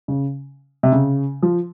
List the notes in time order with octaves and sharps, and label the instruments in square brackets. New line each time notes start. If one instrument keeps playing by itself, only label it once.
[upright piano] C#3
C3
C#3
F3